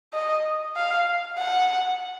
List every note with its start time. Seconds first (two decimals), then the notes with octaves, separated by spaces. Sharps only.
0.13 D#5
0.76 F5
1.38 F#5